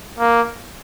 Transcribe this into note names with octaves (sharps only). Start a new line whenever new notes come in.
A#3